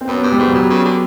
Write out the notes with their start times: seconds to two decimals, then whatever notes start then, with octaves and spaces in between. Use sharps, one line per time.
0.01 C4
0.07 F#2 B3
0.19 B3
0.23 G2
0.32 G3
0.38 G#2 F#3
0.54 G2 F#3
0.70 C#3
0.85 D3